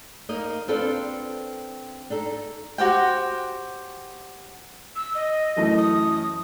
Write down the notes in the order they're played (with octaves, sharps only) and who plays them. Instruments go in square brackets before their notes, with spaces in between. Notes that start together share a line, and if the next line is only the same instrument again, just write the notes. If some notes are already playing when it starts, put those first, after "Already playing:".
[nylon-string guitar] A#3 D#4 D#5
C4 D4 F4 A4 B4
D4 D#4 A4
[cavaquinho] F#4 G4 C5 G5
[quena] E6
D#5
[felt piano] F#2 E3 A3
[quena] D#6